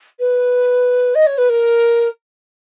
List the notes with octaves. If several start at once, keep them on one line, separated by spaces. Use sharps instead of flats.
B4
D#5
C#5
B4
A#4